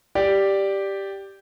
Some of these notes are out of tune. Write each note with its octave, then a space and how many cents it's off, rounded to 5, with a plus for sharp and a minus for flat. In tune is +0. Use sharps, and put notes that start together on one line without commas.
G4 +0 D5 +0